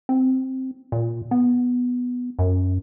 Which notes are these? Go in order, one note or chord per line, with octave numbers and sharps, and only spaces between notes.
C4
A#2
B3
F#2